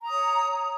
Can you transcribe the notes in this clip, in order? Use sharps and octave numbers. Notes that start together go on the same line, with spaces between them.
C#5 A#5 D#6